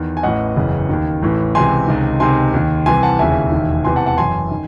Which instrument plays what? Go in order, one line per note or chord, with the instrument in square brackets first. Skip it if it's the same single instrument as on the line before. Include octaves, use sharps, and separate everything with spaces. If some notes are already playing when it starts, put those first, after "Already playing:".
Already playing: [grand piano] E2 D#3 D#5
G#5
A1 A2 E3 D#5 F#5
F#1 E2 C#3 E3
D#2 D#3
A1 A2 E3
C#2 C3 E3 G#5 C6
C#2 C3 D#3
C#2 C3 D#3 G#5 C6
D#2 D#3
C2 C3 E3 G#5 C6
F#5 A5
E1 D#2 C#3 E3 E5 G#5
E1 D#2 D#3
E1 E2 C3 E3 G#5 C6
F#5 A5
F#5 A5
F#1 F#2 E3 G#5 C6
D#3